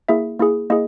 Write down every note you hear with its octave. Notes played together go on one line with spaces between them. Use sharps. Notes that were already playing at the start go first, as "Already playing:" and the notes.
A#3 E4 G#4 E5
A#3 E4 G#4
A#3 E4 G#4 D#5